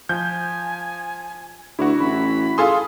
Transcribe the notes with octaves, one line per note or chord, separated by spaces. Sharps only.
F3 G#5 G6
D2 E4 F#4
A1 B5
F4 G#4 A4 C6 D#6